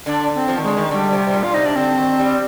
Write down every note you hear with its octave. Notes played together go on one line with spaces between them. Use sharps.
D3 D4
C4
F3
D#3
D3 G#3
D#3
D3 G3
C3
C3
A#2
F4
C3 D#4
D4
D3 C4
D#3
G3